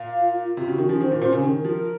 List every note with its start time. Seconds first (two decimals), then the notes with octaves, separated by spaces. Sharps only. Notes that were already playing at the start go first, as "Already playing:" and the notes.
Already playing: A#2 F5
0.14 F4
0.36 F4
0.57 C3 F#4
0.68 C#3
0.78 D#3 C#4
0.89 F3
1.00 D#3 C5
1.11 A#2
1.21 A#2 C#4
1.33 C#3
1.43 D#3 A#4
1.64 F3 A#4